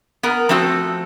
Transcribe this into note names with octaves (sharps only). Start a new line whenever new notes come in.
B3 A#4 A#5
F3 A3 C4 F#4 G#4 A4